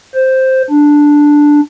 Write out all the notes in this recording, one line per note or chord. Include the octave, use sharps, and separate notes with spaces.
C5
D4